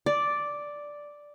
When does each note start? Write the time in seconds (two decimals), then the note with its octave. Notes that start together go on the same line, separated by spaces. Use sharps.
0.06 D5